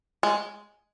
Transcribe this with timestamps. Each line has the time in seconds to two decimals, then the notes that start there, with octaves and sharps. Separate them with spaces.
0.23 G#3